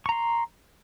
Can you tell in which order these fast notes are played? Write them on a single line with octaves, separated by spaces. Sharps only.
C#6 A#5 C6